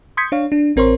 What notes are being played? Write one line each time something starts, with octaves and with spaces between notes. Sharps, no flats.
C6 D#6 G6 G#6 B6 C#7
D4 C#5 F5
D4
A1 C4 A#4 C5 C#5 C6